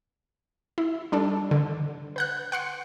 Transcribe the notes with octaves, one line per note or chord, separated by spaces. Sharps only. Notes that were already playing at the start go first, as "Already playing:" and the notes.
E4
G3 D4 A4
D3
B4 F#5 F#6
F#5 C6 C#7